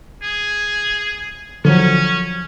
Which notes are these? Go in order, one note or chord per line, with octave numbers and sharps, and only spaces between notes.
G#4
D3 F3 F#3 C#4